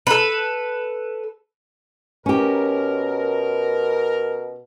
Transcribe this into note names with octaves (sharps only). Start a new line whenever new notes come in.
A4 B4
B2 C#4 G4 A#4